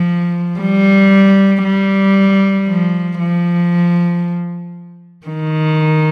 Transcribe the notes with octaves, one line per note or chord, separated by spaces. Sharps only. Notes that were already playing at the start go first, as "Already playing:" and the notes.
Already playing: F3
G3
G3
F3
F3
D#3